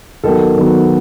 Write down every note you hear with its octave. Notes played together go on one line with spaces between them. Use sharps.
D#2 D#3 F#3 B3 A4
D#2 D#3 F#3 B3